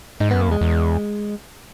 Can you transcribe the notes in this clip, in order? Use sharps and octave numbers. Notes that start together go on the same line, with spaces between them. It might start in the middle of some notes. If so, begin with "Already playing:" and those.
G#2 D#4
F#2 B3
A#3
E2 G#3
E2